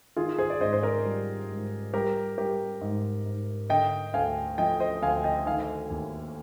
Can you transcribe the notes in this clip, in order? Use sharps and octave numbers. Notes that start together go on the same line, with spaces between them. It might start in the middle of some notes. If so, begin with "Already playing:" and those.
D#3 F4 G#4
G#4 C5
D5
G#2 C5 D#5
C5
A#4 D5
G3
G#2
G3 G4 A#4
G3 G4 A#4
G#2
G#2
D3 D#5 G5
D2 F5 G#5
F3 D#5 G5
C5 D#5
D2 F5 G#5
D#5 G5
D#3 F5 G#5
D#2